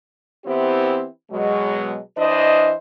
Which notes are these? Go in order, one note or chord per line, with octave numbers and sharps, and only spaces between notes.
E3 B3 C4 E4 G4 C5
B2 F#3 G#3
E3 D4 C5 D#5